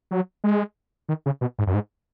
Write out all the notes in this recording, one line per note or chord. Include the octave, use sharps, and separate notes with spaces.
F#3
G#3
D#3
C#3
B2
G#2
F#2
G#2